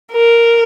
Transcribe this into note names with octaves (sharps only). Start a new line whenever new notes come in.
A#4